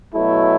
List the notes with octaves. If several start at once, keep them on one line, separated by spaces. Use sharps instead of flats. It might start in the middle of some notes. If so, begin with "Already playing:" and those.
B2 F#3 A3 E4